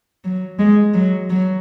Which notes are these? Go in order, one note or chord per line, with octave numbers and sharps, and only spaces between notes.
F#3
G#3
F#3
F#3